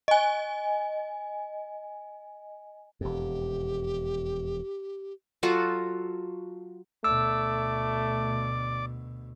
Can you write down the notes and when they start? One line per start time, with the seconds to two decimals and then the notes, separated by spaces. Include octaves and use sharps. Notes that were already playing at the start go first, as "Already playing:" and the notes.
0.08 D#5 G#5
3.01 E1 F2 G4
5.43 F#3 F4 F#4 A4
7.04 D2 B2 A3 D5 D6 E6